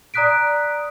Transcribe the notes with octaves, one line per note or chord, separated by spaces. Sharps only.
D5 A#5 D#6 F#6 B6 D7